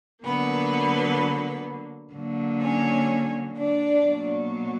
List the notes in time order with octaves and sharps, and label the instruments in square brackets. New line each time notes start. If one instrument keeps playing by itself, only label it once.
[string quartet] D3 F#3 A#3 B3 B4
D3 F#3 A#3
C#4 C#5
D4 D5
B2 F#3 A#3